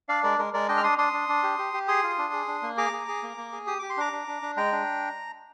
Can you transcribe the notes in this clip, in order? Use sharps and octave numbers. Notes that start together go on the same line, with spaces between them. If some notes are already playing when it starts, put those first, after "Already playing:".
D4 D5 F5
G#3 A#4 D5
G#3 A#4
G#3 A#4 D5
D4 D#5 G5
F6
D4 C6 D#6
D4 C6 D#6
D4
D4
G4
G4
G4
G#4 C6 D#6
F4
D4
G#4
D4
A#3
G#4 A#5 D6
G#4
G#4
A#3
A#3
G#4
G4 D#6
G4 D6
C6
D4 A#5 D6
D4
D4
D4
G#3 G5 A#5
D4